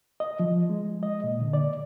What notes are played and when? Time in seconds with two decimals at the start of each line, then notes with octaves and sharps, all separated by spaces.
0.20 D#5
0.39 F3
0.70 G#3
1.03 D#5
1.24 A#2
1.41 D3
1.53 D5